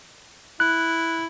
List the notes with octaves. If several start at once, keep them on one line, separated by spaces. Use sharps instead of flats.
E4 F#6